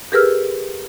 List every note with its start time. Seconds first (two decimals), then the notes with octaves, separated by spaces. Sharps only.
0.12 G4 G#4 A#4 B4 E6 F6